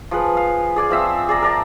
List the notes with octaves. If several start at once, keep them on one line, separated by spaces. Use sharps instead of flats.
F3 G#4 B4
F5
G#4 D5 G#5
F3 C4 E5
G#4 D5 A#5
A#4 D5 A5